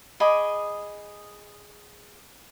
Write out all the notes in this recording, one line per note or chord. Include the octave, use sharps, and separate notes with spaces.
G#4 D#5 B5 D6